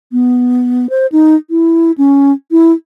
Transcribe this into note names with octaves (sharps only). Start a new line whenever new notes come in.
B3
C5
D#4
E4
C#4
E4